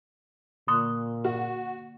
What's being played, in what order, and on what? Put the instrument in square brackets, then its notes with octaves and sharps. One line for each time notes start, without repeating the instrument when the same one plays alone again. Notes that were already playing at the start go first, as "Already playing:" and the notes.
[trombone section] A#2 [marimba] D3 A#3 F#6 [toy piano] C6 C#6 D#6
[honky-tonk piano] F#4